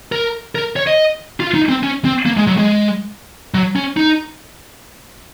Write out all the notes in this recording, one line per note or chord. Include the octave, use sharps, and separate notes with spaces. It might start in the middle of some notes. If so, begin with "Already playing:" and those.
A#4
A#4
C#5
D#5
F4
D#4
C4
C#4
C4
A#3
G#3
F#3
G#3
F#3
C#4
D#4